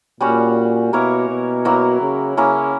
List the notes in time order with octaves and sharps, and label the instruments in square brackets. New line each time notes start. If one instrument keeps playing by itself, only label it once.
[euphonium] A#2 [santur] G3 C#4 F#4
[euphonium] B2 [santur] A#3 E4 A#4 C#5
[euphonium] B2
[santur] F#3 A#3 E4
[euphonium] C#3
[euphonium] C#3 [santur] A#3 C#4 E4